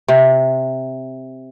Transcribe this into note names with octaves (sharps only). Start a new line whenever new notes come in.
C3